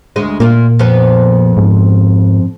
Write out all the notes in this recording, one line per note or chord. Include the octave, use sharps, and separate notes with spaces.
D2 G#3 D#5
A#2 A#3 F4
F2 F3 B3
G#2